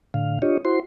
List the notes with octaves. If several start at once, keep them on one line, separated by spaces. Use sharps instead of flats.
A2 D3 F5
D4 F4 G4 C#5 D#5
E4 F#4 C5 C6